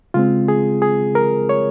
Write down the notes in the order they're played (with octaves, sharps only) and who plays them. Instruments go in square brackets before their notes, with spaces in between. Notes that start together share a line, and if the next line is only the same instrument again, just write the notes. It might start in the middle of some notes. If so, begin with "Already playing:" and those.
[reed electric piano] C#3 G#3 C4 F4
G#4
G#4
A#4
C#5